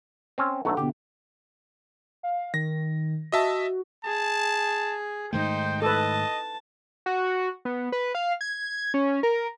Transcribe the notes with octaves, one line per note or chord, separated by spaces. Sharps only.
C4 C#4
B1 F#3 A3 D4 A4 F#5
B2 D3 G4
F5
D#3 A#6
F#4 D#5 E5 A5
G#4 A5
G#2 D#3 A3 D#4 C5 G5
A4 B4 D#5 A5
F#4
B3
B4
F5
G#6
C#4
A#4